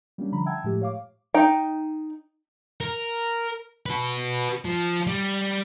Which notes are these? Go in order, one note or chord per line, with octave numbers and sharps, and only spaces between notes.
G3 A#3 B3 C#4 D4
D3 F3 A#5 B5
E5 F#5 G5 A5 E6 G#6
A2 F3 G#3 A3 G4
C#5 F5 D6
D#4 G5
A#4
F#4 B4
F3
G3